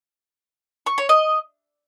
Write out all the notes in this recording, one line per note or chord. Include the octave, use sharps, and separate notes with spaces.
C#6
C#5
D#5